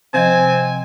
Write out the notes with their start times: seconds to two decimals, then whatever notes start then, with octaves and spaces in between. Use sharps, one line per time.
0.14 C3 F3 C4 D#5 G#5